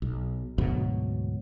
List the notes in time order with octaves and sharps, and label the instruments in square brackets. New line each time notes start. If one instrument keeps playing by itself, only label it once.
[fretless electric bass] B1
D2 G#2 B2 F#3